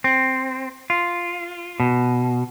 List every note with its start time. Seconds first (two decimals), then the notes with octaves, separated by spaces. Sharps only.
0.04 C4
0.90 F4
1.80 B2